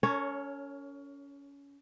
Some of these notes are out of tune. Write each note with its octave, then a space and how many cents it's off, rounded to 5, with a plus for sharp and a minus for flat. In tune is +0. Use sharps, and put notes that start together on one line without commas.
C#4 +25 A#4 -40 C#5 +0